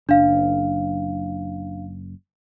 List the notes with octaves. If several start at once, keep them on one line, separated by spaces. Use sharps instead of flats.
F#1 D4 F5